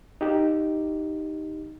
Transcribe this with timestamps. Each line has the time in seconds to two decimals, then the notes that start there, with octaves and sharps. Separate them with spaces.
0.21 D#4 G4